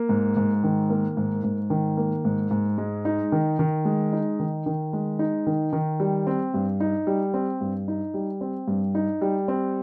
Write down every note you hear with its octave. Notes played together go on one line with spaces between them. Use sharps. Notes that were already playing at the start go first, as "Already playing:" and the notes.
Already playing: A#3
G#2
G#2
D#3
A#3
G#2
G#2
D#3
A#3
G#2
G#2
G#3
D#4
D#3
D#3
G#3
D#4
D#3
D#3
G#3
D#4
D#3
D#3
G3
C4
G2
D#4
G3
C4
G2
D#4
G3
C4
G2
D#4
G3
C4